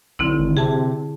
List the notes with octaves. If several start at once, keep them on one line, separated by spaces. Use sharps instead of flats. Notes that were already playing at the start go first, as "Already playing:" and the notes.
B1 D3 C4 E4
G#1
C3 G#4 A5